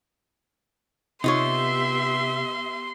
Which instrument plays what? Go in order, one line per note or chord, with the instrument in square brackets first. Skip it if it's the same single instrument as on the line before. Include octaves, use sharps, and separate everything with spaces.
[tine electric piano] C3 [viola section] B3 G4 E5 [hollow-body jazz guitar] D#4 F4 C#5 [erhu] C6